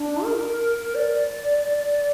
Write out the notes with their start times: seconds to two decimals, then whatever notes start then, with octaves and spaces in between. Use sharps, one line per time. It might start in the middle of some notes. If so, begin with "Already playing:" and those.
Already playing: D4
0.24 A#4
0.95 D5